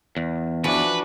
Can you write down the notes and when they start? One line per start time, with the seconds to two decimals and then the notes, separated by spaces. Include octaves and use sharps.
0.17 E2
0.64 E3 F3 D4 F#4 B4